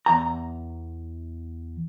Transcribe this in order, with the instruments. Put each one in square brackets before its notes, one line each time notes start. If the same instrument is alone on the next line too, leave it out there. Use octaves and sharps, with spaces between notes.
[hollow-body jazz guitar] E2 A#5